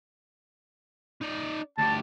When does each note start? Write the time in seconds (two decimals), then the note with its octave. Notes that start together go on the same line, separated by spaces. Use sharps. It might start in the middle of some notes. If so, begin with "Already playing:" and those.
1.21 D#4 D5
1.78 D2 G4 A5